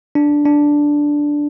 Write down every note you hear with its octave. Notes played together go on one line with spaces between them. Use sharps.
D4
D4